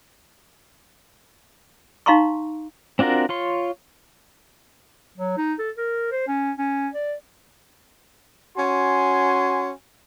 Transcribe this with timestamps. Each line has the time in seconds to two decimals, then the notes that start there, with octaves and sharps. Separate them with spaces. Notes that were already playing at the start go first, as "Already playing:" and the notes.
2.06 D#4 F5 A#5 C6 C#6
2.99 C4 D4 F4 F#4 A#4
3.29 F4 C#5 C6
5.18 F#3
5.37 D#4
5.59 A4
5.77 A#4
6.12 C5
6.28 C#4
6.58 C#4
6.94 D5
8.57 C#4 F#4 G#5 C6